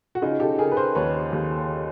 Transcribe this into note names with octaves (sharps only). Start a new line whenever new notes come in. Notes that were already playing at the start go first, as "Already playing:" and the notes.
F#4
C#3 D#4 F4
G4 A4
C#3 G#4 A#4
B4
A#4 C5
D#2 B4 C#5
D#2